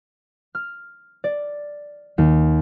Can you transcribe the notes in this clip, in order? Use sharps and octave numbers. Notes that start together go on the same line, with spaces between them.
F6
D5
D#2